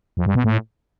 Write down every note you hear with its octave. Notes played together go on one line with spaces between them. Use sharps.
F2
G2
B2
A2